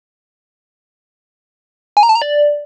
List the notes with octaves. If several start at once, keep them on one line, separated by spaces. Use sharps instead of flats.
G#5
A#5
A5
A#5
D5